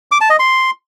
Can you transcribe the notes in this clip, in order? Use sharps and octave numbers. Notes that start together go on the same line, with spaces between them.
D6
A5
D#5
C6